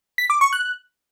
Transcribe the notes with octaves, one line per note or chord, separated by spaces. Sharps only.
B6
D6
C#6
F#6